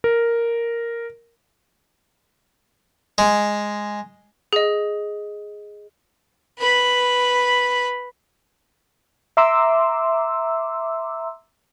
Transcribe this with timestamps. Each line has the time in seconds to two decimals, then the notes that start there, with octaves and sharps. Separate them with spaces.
0.04 A#4
3.18 G#3
4.53 G#4 D#5
6.59 B4 B5
9.37 E5 A#5 C6 D6 E6